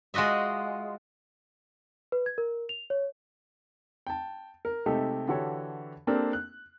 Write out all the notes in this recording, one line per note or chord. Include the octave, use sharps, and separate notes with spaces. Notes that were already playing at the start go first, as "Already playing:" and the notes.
G#3 F4 F#4 D#5 E5
B4
G#6
A#4
F7
C#5
G5 A5
A#4
C3 G#3 A3 D#4 G4 A4
D3 E3 F#4 G4 A4 C#5
A#3 C4 D4 G4 A4 A#4
F#6